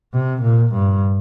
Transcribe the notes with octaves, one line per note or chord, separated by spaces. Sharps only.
C3
A#2
G2